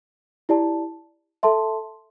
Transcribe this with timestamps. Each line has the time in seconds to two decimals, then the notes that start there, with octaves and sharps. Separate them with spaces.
0.49 E4 G4 D5 A5
1.43 A4 E5 A5 C6